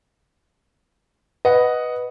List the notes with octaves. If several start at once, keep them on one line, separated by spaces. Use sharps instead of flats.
B4 D#5 F#5